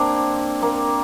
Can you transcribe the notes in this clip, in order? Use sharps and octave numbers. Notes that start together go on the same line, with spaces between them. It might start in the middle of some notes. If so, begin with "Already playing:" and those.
Already playing: A#3 C4 D4
A#3